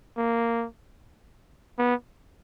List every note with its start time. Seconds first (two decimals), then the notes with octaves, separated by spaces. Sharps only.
0.18 A#3
1.78 B3